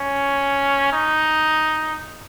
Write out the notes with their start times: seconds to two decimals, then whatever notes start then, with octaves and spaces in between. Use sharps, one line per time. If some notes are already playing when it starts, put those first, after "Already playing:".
Already playing: C#4
0.93 D#4